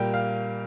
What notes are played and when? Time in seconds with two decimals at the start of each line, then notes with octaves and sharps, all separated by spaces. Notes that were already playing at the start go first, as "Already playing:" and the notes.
Already playing: A#2 G3 A#3 G5
0.14 F5